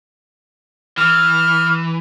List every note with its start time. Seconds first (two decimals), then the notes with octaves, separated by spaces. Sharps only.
0.98 E3 F6